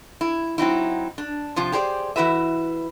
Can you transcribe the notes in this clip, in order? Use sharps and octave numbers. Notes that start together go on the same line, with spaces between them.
E4
F#3 C4 D#4 E4
D4
C3 F3 F4
G4 G#4 C5 D5
E3 E4 F#4 B4 E5